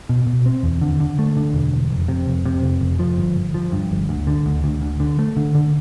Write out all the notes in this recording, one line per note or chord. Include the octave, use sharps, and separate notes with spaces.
B2
B2
C4
E2
D3
D3
A3
D3
E1
E1
F1
C3
F1
C3
F1
F1
F3
G1
G1
F3
G2
G1
D2
D3
D2
D2
D2
D3
A3
D3
D3